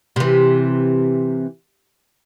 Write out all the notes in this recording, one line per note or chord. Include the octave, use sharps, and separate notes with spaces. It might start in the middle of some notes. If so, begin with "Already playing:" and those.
C3 E3